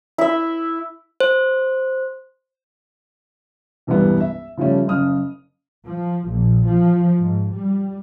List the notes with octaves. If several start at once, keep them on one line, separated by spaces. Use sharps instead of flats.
E4 E5
C5
E1 C2 G2 E3 G3 B3
E5
C#3 F3 G3 A3 C#4
F#1 C#3 D#6 F6
F3
A#1
F3
G#2
G3